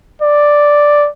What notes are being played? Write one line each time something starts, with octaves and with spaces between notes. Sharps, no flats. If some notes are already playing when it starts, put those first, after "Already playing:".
D5